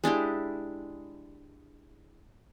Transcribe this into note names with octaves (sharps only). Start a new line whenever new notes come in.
G#3 D4 E4 G4